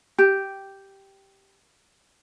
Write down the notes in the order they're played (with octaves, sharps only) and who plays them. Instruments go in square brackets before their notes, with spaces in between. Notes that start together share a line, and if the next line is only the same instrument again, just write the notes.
[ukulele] G4 G5